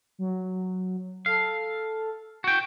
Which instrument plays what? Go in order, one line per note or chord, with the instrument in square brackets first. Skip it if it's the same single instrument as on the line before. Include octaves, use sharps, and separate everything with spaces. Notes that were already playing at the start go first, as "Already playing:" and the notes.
[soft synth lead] F#3
[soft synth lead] A4 [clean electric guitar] F5
[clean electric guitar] F#4 G5